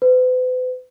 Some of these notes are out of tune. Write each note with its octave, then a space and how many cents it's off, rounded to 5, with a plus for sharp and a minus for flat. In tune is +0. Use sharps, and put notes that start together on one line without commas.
B4 +45